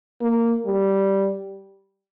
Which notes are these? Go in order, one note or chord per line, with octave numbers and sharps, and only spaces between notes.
A#3
G3